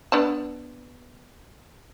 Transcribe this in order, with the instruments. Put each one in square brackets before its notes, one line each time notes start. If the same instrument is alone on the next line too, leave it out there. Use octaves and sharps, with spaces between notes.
[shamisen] B3 D4 A5